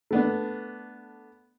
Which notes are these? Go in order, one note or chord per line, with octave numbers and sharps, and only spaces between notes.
A3 B3 D4